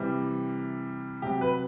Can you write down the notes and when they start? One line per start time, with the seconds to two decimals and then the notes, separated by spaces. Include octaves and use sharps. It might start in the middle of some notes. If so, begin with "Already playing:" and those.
Already playing: C3 E3 G3
1.22 C3 F#3 G4
1.41 B4